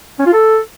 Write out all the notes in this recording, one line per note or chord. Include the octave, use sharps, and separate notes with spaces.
C#4
F4
A4